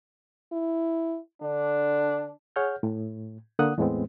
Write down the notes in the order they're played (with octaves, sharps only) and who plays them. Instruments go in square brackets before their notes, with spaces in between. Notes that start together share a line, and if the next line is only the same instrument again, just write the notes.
[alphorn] E4
[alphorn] D3 [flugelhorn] D4
[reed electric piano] G#4 C#5 F#5 F6 G6
A2
D3 A#3 F#5 D#6 F#6
E2 A2 G#3 B3 C4